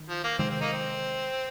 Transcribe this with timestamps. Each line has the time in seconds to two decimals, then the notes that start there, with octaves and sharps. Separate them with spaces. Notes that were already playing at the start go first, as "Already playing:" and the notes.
Already playing: D#3
0.09 F3
0.24 A#3
0.39 C3 D#3 G#3 C4
0.50 C4
0.61 A#3 D#4
0.73 C4